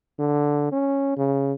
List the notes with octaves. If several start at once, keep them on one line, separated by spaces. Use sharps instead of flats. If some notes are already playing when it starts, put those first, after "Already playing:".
D3
C#4
C#3